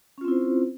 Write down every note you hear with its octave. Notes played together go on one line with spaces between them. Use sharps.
C4 C#4 E4 F4 C5